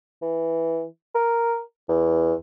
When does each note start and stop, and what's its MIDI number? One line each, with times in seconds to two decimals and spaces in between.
0.22 0.84 52
1.15 1.61 70
1.89 2.34 40